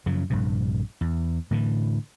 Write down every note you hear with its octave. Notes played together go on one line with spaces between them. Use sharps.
F#2 C#3 F3
A#1 G2 C3
E2
A2 D3 E3